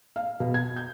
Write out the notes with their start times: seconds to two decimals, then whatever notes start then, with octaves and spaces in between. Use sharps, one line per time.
0.16 F5
0.40 B2
0.54 G#6
0.76 G6